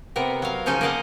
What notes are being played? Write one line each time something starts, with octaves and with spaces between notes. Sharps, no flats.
C3 B3 A#4
F#3 F5
C#3 F3 C#4 D#4 F4 G#5
A#3 D5 D#5 F5 F#5